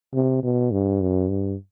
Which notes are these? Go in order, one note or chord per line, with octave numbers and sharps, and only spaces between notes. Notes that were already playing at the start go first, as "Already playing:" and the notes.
C3
B2
G2
F#2
G2